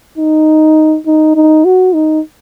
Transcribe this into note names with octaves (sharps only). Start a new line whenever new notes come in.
D#4
D#4
D#4
F#4
D#4